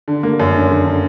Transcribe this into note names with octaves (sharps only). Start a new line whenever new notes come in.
D3
A#3
F#2
D3
D3
D3